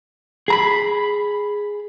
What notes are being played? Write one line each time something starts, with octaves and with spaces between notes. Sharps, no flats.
G#4 A#5 B5